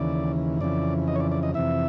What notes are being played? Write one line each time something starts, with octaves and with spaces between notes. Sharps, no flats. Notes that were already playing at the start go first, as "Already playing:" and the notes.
Already playing: D#2 C#3 E3 D5
F2 C#3 E3 D5
D#5
C#5
D5
D5
D#5
F2 C3 E3 E5